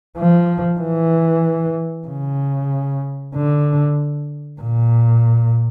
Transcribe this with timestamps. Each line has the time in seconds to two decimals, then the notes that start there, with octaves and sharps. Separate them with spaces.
0.17 F3
0.80 E3
2.07 C#3
3.34 D3
4.61 A#2